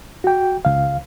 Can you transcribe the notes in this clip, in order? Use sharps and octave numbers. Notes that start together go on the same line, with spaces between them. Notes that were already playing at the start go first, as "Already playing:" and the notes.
F#4 G5
C#2 F5